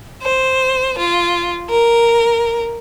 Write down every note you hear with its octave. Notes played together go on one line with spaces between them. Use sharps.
C5
F4
A#4